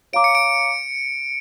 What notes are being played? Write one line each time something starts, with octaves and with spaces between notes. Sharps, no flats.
C#5 F5 A#5 D6 D7
C#7
D7